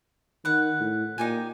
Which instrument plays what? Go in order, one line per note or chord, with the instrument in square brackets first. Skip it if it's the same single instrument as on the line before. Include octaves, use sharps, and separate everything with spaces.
[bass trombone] D#3 [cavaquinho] B4 F#5
[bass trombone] A2
[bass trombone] A#2 [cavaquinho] D#4 G4 G#5